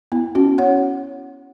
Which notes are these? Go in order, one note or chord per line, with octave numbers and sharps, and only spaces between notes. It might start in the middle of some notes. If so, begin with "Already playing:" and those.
B3 E4
C#4 F#4
C#5 F#5